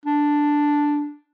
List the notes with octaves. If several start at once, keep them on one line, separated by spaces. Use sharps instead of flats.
D4